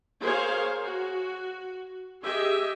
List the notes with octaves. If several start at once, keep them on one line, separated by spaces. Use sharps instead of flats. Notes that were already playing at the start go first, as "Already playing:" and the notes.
G#4 A#4 C5 C#5 F5
F#4
G4 G#4 D#5 E5